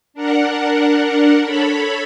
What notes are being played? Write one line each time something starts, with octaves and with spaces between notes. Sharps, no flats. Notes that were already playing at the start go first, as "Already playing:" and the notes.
D4 A#4 F#5
A4 C#5 B5